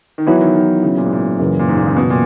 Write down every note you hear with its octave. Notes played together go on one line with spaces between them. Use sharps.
D#3
E3 F#3 B3 E4
D#3
D#3
C#3
A#2
G#2
A#2
F#2 C#3 E3
A#2
G#2
A#2
C#3
B2
A#2